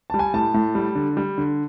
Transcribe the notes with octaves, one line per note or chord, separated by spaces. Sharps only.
G3 A5
G#5
A2 A5
A2
G3
D3
G3
D3